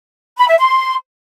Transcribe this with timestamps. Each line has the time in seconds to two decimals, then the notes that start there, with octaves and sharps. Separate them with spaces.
0.39 B5
0.49 E5
0.59 C6